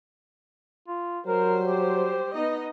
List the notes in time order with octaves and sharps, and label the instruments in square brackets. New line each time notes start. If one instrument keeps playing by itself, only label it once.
[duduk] F4
[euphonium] F#3 [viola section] G3 C5 [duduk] A#4
[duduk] G4
[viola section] B3 D#4 D#5